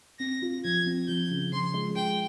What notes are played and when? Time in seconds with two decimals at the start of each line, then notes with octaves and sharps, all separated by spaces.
0.19 C4 A#6
0.42 F4
0.64 F3 G#6
0.86 C4
1.08 F3 G6
1.31 C#3
1.52 F3 C6
1.74 G#3
1.96 G#3 G5